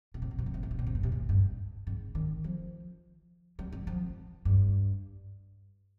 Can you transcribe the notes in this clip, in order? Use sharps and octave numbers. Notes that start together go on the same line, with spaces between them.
A#2
C3
A#2
C3
A#2
C3
A#2
C3
A#2
C3
A#2
C3
A#2
G2
G#2
D#3
F3
G3
G3
F3
G2